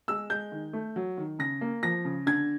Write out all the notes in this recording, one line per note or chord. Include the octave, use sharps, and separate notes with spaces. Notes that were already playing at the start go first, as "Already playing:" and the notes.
G#3 E6
G#3 G6
D#3
A3
F#3
D#3
C#3 A#6
A#3
F3 A#6
C#3
D3 G#6